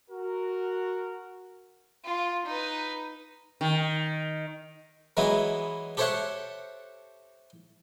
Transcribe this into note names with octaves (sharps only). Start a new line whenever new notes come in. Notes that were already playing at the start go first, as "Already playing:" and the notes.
F#4 A#4
F4
D#4 B4
D#3
E3 F#3 G#3 B3 D#4 E4
G4 A4 C5 C#5 E5 F#5